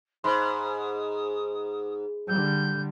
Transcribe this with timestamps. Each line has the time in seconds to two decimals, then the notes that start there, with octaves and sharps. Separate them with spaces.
0.24 G#2 C5 B5 C6 D#6
2.28 D3 G3 G6